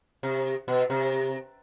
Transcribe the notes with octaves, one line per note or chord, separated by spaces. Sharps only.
C3
B2
C3